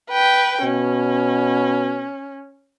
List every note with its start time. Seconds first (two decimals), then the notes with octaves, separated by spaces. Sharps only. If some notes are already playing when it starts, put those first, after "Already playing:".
0.10 B4 G5
0.63 B2 C#4